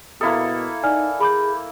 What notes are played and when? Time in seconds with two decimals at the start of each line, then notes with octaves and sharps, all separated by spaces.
0.21 B2 A#3 E4 A4 D#6
0.83 D#4 D5 G#5 F6
1.21 G#4 B5 D6 G6